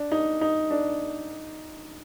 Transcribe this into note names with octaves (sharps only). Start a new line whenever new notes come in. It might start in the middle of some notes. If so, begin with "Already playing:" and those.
Already playing: D4
D#4
D#4
D4